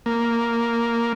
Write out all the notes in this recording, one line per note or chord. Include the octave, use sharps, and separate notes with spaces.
A#3